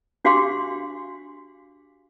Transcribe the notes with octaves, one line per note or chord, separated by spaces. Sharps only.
D4 F#4 G4 F5 C6 D6